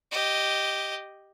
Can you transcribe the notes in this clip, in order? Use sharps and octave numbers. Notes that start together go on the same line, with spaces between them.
G4 D#5